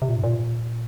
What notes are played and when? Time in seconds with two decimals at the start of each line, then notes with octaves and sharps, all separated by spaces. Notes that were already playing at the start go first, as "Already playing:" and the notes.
0.02 C3
0.09 A#2
0.17 G#2
0.24 A#2